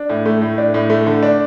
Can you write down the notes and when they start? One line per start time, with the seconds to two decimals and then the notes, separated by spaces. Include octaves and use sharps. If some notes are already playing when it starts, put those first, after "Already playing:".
Already playing: D4
0.09 A2
0.25 A3
0.42 A2
0.58 D4
0.74 A2
0.90 A3
1.06 D3
1.23 D4